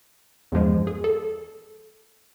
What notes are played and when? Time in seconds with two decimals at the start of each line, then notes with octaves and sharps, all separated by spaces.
0.52 E2 G2 F3 G#3
0.87 G#4
1.04 A4